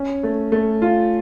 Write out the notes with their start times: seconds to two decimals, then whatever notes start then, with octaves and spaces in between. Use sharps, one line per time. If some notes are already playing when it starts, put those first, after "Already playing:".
Already playing: C#4
0.23 A3
0.52 A3
0.82 F4